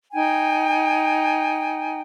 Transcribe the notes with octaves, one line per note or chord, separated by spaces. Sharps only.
D#4 G5 G#5